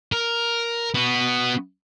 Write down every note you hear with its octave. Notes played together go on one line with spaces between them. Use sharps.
A#4
B3 F#4